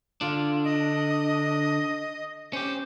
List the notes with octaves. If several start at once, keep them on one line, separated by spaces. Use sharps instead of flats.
D3 D4 F4
D#5
C#4 G4 C5